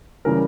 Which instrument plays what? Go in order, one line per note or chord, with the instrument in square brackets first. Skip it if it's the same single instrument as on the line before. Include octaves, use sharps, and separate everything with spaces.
[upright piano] C#3 E3 G3 A#4